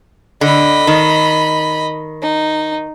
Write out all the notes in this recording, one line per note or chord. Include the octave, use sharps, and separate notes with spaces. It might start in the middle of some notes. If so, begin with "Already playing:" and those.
D3 D#5 B5
D#3
D#4